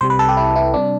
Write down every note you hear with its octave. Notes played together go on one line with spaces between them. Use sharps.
C2 C3 G3 C5
B4
A4
G4
E4
E4
C3 G3 D4